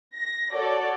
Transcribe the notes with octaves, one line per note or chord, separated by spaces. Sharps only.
A#6
F#4 A4 C#5 D5